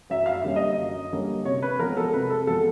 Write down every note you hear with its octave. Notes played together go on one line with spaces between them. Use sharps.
F#2 E5
F5
E5
D3 G3 A#3 C#4
D#5
F#2
D3 G3 A#3 C#4
C3 C#5
B4
F3 G#3 B3 A#4
A4
C3 B4
A4
F3 G#3 B3 A4